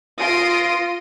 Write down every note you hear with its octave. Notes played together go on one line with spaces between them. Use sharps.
F4 C6 D#6 A#6 D7